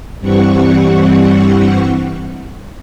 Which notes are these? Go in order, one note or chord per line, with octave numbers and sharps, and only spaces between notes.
G2 E3 G3 C4 F#5 C#6